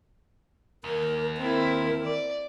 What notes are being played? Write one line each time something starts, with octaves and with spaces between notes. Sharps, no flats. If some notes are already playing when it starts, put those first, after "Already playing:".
D#2 A#4
C4 E4 A#4
D5